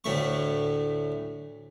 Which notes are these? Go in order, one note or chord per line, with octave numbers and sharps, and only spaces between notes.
D2 A2 A3 C#6